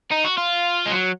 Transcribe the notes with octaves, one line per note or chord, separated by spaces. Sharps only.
D#4
F#4
F4
G#3
F#3